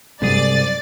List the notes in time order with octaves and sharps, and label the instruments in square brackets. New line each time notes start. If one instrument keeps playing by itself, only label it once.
[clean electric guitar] C2 G#4 [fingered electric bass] G2 F#3 G#3 [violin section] D5 A6